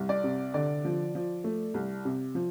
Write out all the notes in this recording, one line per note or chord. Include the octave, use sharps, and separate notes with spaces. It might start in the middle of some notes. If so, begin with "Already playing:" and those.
Already playing: C2
D5
C3
D3 D5
F3
F3
A3
C2
C3
F3